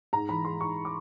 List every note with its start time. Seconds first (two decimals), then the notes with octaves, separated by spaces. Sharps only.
0.13 G#2 A#5
0.29 E3 B5
0.45 G#3 C6
0.61 G#2 C#6
0.85 D6